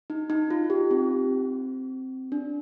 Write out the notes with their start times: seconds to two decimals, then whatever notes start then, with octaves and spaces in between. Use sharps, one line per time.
0.10 D#4
0.30 D#4
0.50 F4
0.70 G4
0.91 C4
2.32 D4